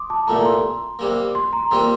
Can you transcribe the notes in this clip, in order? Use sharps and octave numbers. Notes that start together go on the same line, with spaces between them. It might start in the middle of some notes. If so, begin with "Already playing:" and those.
Already playing: C6 D6 D#6
A5
C2 A#2 A3 A#5
C6
C3 G3 A#3
C6
A#5
C3 G3 A#3 F4 C6